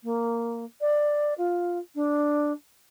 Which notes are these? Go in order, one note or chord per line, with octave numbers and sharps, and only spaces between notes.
A#3
D5
F4
D4